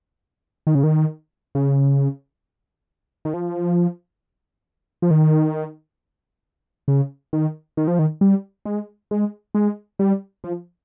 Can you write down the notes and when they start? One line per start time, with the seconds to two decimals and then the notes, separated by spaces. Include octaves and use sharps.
0.67 D#3
0.75 C#3
0.83 D#3
1.55 C#3
3.25 D#3
3.34 F3
5.02 F3
5.11 D#3
6.88 C#3
7.33 D#3
7.77 D#3
7.88 F3
7.99 D#3
8.21 G3
8.65 G#3
9.11 G#3
9.55 G#3
9.99 G3
10.44 F3